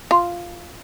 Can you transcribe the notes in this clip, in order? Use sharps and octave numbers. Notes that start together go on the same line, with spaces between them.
F4